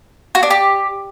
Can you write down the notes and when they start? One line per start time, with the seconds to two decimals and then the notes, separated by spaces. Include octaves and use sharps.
0.35 F#4
0.43 D4
0.50 G4